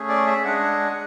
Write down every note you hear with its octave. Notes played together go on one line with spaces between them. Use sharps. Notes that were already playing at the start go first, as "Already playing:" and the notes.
Already playing: A3 C#4 G#4
D5
E5
G#3 D4 G#4 F#5